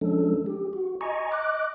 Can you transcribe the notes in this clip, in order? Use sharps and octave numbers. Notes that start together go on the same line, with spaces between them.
F3 G#3 C#4 D4 A4
G4
F#4
D#5 G#5 A#5 C#6
D#5 D6 F#6